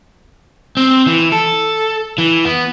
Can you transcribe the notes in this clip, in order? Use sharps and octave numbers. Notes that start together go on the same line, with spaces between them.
C4
E3
A4
E3
B3